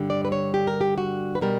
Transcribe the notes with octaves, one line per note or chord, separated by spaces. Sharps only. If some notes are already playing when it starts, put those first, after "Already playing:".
Already playing: G2 D3 G3
D5
B4
C#5
G4
A#4
G4
F#4
B4
B2 G3 A#4